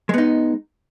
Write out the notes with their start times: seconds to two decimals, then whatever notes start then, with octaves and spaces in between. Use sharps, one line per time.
0.09 G#3
0.14 B3
0.18 D#4